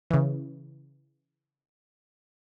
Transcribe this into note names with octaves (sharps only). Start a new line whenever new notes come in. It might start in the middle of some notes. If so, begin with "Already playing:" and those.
C#3 E3